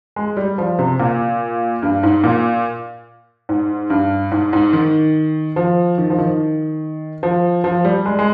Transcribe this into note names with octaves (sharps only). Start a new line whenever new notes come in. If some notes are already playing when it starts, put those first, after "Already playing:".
G#3
G3
F3
C3
A#2
G2
G#2
A#2
G#2
G2
G#2
G#2
D#3
F3
D#3
F3
D#3
F3
F3
G3
G#3
G#3